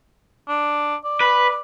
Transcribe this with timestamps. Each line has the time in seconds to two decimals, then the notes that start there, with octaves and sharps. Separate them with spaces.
0.48 D4
1.04 D5
1.21 B4